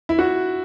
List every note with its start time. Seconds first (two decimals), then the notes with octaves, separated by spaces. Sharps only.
0.09 E4
0.19 F#4